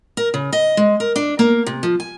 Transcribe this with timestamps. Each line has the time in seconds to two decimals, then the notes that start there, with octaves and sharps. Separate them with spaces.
0.17 A#4
0.34 C#3
0.53 D#5
0.77 G#3
1.00 A#4
1.16 D4
1.39 A#3
1.66 C3
1.83 F3
2.00 G#5